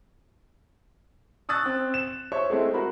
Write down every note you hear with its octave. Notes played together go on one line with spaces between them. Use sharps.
C#6 D#6 E6 F#6 A6
C4
E7
C5 C#5 E5 C#6
G#3 A3 C4 E4
F#4 A#4 B5